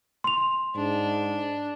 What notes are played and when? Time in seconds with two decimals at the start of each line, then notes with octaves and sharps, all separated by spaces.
0.24 C6 F7
0.75 G#2 D4